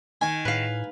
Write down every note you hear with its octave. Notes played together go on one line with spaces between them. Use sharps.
D#3 G#5
A2 B4 F5